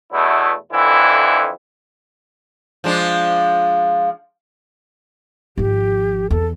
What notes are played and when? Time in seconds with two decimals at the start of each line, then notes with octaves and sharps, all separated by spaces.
0.13 E2 B2 A3 E4
0.72 F2 D3 E3 E4
2.84 F3 G#3 D4
5.58 G#1 F3 G4
6.31 E2 A4